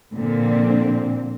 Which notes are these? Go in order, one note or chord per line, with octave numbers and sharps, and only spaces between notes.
A#2 D3 F3 C4